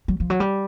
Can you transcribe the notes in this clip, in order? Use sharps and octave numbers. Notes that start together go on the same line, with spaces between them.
F#3
F3
F#3
G3